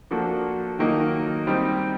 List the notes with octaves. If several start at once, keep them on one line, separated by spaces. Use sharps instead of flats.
F3 A#3 D4 F#4 A4
D#3 F#3 A#3 D#4
G3 C4 D#4